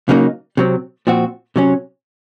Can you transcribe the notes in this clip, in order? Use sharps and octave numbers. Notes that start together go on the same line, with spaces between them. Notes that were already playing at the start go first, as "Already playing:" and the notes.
C#3 F#3 A#3 D#4
C3 F#3 C4
A#2 F3 C4 F#4
C3 F#3 C#4